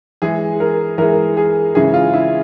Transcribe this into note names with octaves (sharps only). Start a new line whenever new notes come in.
E3 G#3 G#4
A#4
E3 G#3 A#4
G#4
C#3 E3 G#3 G#4
F4
E4